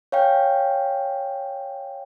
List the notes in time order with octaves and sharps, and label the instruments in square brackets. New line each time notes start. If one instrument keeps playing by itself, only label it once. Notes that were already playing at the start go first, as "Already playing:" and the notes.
[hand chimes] C#5 F5 G5 G#5